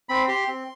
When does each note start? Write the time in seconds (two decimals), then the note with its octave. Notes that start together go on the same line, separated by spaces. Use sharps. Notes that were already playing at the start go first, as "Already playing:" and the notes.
0.09 C4 B5
0.28 G4 C6
0.48 C4